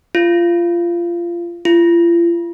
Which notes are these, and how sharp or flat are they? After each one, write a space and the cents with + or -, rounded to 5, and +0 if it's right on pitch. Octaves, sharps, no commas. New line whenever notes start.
F4 -20
F4 -45